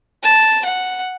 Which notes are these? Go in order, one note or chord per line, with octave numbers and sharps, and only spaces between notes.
A5
F#5